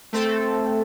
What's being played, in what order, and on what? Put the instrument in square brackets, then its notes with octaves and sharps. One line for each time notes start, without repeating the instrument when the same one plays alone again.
[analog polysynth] A3 C4 A4